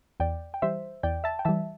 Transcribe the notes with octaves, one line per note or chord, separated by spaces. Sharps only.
E2 D5 G5
G5
E3 G3 C5 E5
E2 D5 G5
E5 A5
G5
E3 G3 E5 A5